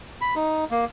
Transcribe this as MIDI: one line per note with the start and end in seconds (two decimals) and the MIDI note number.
0.21 0.34 83
0.36 0.65 63
0.71 0.85 58